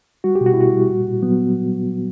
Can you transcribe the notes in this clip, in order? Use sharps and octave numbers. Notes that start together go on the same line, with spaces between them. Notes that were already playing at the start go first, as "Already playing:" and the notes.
G3 F#4
G4
B2
F#4
E4
B2 F#4
G3
A#2
A#2
F#3 B3